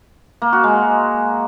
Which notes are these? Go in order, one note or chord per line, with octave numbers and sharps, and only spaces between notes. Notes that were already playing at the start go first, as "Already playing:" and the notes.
A#3
F#4
G#3